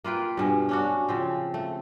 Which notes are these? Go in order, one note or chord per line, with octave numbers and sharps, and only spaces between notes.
A#3 F4 B4 G5
G2 B2 G#4
C#4 D4 F#4
C#3 F3 C4
A3